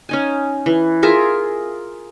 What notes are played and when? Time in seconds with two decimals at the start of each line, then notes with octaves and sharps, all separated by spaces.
0.09 C#4 D#4 G#5
0.66 E3
1.03 F4 G#4 A#4 E5